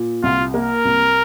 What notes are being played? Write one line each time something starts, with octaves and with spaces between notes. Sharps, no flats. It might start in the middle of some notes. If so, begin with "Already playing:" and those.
Already playing: A#2
C2 F4
A#3 A#4
C2